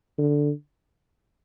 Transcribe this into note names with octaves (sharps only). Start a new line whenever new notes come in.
D3